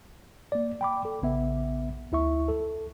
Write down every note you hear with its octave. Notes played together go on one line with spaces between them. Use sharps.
A#3 D5
G5 B5 D6
A4
A#1 C#3 B3 E5
D2 E4 E5 C#6
A4